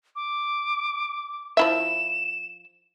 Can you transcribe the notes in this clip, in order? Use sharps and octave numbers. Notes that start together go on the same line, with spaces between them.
D6
F3 E4 E5 E7